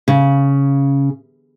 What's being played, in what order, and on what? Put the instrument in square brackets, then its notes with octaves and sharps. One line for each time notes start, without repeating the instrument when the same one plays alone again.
[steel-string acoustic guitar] C#3